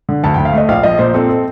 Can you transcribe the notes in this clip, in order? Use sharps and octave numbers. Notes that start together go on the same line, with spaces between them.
D3
D2 A5
D2 G5
F5
A3 D#5
A#1 F5
F3 D#5
A#2 C5
C4 A4
A4